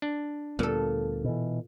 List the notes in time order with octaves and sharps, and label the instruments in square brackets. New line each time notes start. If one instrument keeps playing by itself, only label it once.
[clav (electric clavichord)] D4
[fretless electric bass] D2 G3 B3 [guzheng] A#2 A4
[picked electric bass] B2 E3